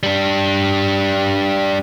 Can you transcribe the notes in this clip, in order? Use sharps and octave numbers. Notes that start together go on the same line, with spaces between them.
G3 D4